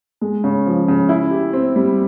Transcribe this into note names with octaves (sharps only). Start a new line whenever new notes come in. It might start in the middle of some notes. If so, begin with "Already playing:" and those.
G#3
C#3
F3
C#3
E4
G4
C4
G3